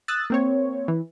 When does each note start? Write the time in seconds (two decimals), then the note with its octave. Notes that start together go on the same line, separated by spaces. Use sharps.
0.08 D#6 E6 F#6 A6
0.30 A#3 C4 C#5
0.88 E3